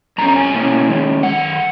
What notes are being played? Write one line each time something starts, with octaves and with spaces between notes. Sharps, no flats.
F#2 C#3 G#3 C#4 A#5
A#5
G#5
B2 A#3 C#4 E4
D#3 G#3 C#4
F#2 D#3 F#5